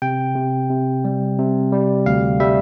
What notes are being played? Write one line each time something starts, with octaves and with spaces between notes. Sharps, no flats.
C3 G5
C3
C3
G3
C3
G3
D2 F5
G3 E5